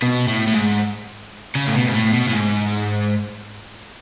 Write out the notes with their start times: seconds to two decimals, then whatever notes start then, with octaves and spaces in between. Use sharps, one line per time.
0.02 B2
0.28 A2
0.48 A2
0.54 G#2
1.56 C#3
1.67 A2
1.76 B2
1.88 G#2
1.95 A2
2.14 B2
2.29 A2
2.33 G#2